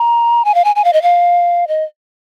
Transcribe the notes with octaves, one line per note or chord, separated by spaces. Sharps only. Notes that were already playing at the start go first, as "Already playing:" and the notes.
Already playing: A#5
G#5
F5
G#5
G#5
F5
D#5
F5
D#5